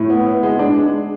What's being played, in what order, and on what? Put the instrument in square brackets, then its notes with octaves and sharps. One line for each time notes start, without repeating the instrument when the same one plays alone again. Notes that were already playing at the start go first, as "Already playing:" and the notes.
Already playing: [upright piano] A2 [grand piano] E4
[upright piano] B3
B3
G#3
D4
G#3